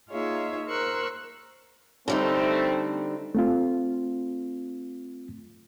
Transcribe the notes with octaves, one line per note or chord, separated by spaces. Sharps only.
A#3 D#4 F4 G#4 C#5 E5
A#4 C5 C#6 E6 F#6
D3 G3 A3 C4 D#4
A3 C4 F4